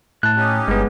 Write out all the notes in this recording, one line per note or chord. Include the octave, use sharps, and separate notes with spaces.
A2 A5 F#6
C#4 D#4 G4
G1 G#3 B3